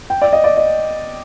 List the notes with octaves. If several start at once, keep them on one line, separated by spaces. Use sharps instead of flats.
G5
D5
D#5
D5
D#5